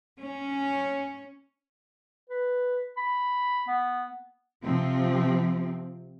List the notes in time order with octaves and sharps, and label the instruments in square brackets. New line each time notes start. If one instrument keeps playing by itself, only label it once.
[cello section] C#4
[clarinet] B4
B5
B3
[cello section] C3 F3 C4